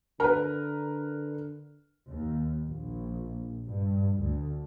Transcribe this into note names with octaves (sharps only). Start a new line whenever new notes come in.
D3 A#4 B4
D#2
A#1
G2
D2